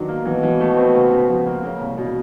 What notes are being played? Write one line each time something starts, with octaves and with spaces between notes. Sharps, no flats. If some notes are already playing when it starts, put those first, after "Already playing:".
Already playing: D#3 F#3 B3 D4
A#3
B2 E3
E3
A3
C4
C#3
C#3
F3
A#3
C#3 A#3
C2
B2